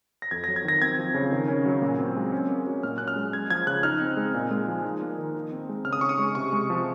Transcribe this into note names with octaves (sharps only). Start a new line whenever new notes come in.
A#6
F2 G#6
A#6
F#3
G#6
D#3 A#6
C4 G#6
F3
C#3
D#3
C#4
F#3
A#2
C4
G#3
C#4
A#3
F#3
A#2 F6
C#4 F#6
F6
G#3
G#3 G#6
F3 G#6
C#3 F#6
D#4 F6
C4
G#3
A#2
G#3
F3
D#4
A#3
D#3
D#4
C4
G#3
C#3 F6
D#6
C#4 C#6
D#6
G#3
C3 C#6
G#3
F3